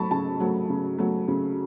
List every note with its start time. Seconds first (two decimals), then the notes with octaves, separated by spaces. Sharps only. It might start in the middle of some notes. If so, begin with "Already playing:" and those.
Already playing: F#3 A3 A5 B5 C#6
0.11 C#3 A5
0.40 F#3 A3
0.70 C#3
0.99 F#3 A3
1.28 C#3